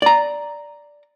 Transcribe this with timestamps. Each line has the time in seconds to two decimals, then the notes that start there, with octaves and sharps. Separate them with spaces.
0.02 D5 A#5